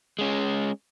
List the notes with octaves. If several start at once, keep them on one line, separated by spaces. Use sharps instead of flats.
G#3 C#4